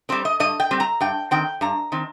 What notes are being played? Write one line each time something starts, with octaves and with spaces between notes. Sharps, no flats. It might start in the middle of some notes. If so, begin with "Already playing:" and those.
G3 C4 C5
D#5
G2 D#5
G5
G3 C4
A#5
G2 G5
D#3 C4 G5
G2 A#5
D#3 C4